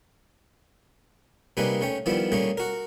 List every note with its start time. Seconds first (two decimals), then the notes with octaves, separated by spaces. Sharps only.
1.57 C3 G3 A#3 D#4 G#4 B4
1.81 A3 C#4 G5
2.06 D#3 F3 G3 B3 E4
2.32 G3 A3 A#3 C#4 G#4
2.58 F#4 A#4